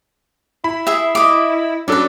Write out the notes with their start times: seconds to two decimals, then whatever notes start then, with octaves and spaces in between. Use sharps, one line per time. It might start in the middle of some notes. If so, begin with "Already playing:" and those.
0.64 E4 B5
0.87 G#4 E5
1.15 D#5 E5 D6
1.88 F#3 C#4 D4 A4 B4 D5